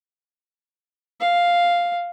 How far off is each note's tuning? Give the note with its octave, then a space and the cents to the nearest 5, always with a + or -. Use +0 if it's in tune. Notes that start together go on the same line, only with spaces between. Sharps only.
F5 +0